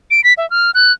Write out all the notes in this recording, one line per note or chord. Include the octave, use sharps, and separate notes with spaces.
D7
B6
E5
F6
F#6